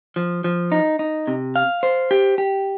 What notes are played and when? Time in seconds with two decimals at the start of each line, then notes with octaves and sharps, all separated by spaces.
0.16 F3
0.44 F3
0.72 D#4
0.99 D#4
1.27 C3
1.56 F5
1.83 C5
2.11 G4
2.38 G4